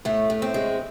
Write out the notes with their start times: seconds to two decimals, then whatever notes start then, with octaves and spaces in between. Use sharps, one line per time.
0.05 A2 A3
0.30 A2
0.42 C4
0.54 G#3